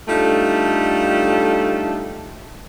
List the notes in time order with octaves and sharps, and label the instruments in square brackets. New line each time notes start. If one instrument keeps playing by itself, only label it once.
[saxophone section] G3 A3 D4 D#4 F4 A4